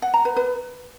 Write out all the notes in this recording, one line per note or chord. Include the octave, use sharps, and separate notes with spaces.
F#5
A#5
B4
B4